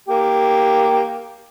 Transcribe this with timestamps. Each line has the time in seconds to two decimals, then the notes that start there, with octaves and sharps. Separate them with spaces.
0.09 A#3 G4